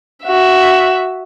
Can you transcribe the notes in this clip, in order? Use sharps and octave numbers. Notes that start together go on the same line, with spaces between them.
F#4 E5